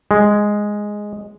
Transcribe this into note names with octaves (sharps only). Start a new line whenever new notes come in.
G#3